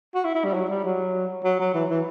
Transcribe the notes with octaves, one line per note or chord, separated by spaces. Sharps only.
F#4
E4
E4
G3
F#3
G3
F#3
F#3
F#3
E3
E3